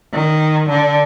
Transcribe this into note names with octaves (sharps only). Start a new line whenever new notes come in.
D#3
D3